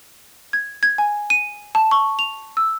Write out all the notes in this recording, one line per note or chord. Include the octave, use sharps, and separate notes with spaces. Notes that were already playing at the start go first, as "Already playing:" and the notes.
G#6
G#6
G#5
D#7
A5
C#6
F7
E6